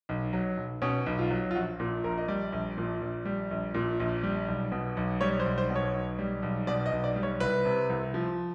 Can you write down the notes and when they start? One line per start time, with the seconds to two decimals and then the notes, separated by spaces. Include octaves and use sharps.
0.09 B1
0.33 F#3
0.57 B1
0.82 B2 C#4
1.06 B1
1.19 F4
1.31 F#3
1.51 F4
1.55 A#1 F#4
1.80 A#2
2.04 A#1 A#4
2.18 D#5
2.28 G3 D5
2.52 A#1
2.77 A#2
3.01 A#1
3.25 G3
3.51 A#1
3.74 A#2
4.00 A#1
4.23 G3
4.48 B1
4.72 B2
4.97 B1
5.21 G3 C#5
5.40 C5
5.46 B1
5.58 C5
5.70 B2
5.76 C#5
5.94 B1
6.19 G3
6.42 B1
6.67 B2 D5
6.86 D#5
6.92 B1
7.04 D5
7.16 G3
7.23 C#5
7.40 C2 B4
7.65 C3
7.89 C2
8.14 F3